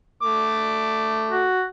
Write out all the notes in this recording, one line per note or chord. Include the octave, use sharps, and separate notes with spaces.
A3 D6
F#4